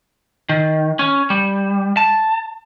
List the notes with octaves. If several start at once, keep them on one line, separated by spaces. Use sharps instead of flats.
D#3
C#4
G3
A5